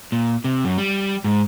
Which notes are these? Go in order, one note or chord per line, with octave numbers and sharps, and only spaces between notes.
A#2
C3
F#2
G3
G#2